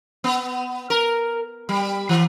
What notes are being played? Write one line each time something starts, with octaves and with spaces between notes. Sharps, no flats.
B3
A#4
G3
E3